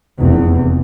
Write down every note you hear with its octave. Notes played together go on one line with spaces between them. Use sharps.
F1 E2